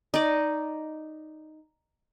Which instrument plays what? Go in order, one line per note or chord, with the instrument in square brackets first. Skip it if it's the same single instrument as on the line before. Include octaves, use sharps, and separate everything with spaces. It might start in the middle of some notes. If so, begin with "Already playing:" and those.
[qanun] D#4 D5